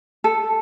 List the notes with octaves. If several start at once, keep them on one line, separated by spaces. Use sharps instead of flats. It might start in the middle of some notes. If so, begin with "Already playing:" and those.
A4